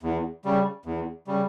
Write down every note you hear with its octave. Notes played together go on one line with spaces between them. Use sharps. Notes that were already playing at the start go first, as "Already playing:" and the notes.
E2
C#3 G3
E2
C#3 G3